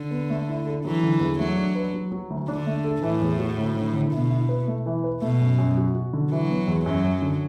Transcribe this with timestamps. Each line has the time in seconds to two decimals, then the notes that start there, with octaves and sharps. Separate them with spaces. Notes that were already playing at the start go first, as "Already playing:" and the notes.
Already playing: D3
0.11 B3
0.30 A3
0.48 E4
0.66 A4
0.85 E3 F#3
1.03 D3
1.20 E2
1.39 F#3 A3
1.57 D4
1.75 B4
1.94 F#3
2.12 F#3
2.30 D2
2.48 D3 D4
2.66 A3
2.84 A4
3.02 A2 E3
3.22 E2
3.39 F#4
3.58 D2
3.76 D3
3.94 D3
4.12 B2 E4
4.30 E4
4.49 B4
4.67 A3
4.86 E3
5.04 B4
5.22 B2 A3
5.41 F#2
5.58 F#2
5.77 F#4
5.95 F#4
6.13 D3
6.31 E3 F#3
6.50 B3
6.68 E2
6.86 F#2 F#3
7.04 F#2
7.22 D3